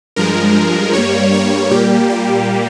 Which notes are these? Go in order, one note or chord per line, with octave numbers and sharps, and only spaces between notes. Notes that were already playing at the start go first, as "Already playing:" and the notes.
G2 F3 G#3 A#4
G2 G3 A#3 C#5
C#5
A#2 G3 A#3 G4
G4